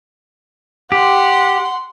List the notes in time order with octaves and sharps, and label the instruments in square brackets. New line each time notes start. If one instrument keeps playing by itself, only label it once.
[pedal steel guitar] G4 [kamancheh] F#5 C6